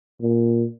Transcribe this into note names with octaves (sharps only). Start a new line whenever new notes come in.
A#2